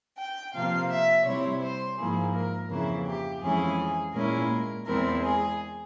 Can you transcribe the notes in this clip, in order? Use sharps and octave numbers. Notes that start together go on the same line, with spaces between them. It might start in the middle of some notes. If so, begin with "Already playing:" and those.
G5
C3 F3 A#3 F5
E5
C3 G3 C4 E4 C#5
C5
G#2 F3 A#3 E4 G#4
A#4
F2 C#3 E3 A#3 E4
G4
F2 E3 G#3 C#4 E4 G#4
A#2 G#3 C#4 E4 A#4
E2 E3 G#3 C4 E4 A#4
G#4